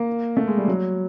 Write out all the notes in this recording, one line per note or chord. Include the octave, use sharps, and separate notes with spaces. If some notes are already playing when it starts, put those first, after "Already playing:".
Already playing: A#3
A3
G#3
G3
F#3